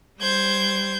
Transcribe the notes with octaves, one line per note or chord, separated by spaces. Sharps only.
G3 C5 G6 G#6